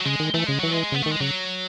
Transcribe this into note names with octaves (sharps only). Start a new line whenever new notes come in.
F#3
C#3 G#3
D#3
E3 A3
C#3 G#3
E3 F#3
G#3
C#3 B3
D#3 A3
G#3
C#3 F#3